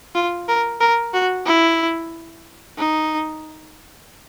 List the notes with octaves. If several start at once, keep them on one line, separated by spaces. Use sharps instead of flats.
F4
A#4
A#4
F#4
E4
D#4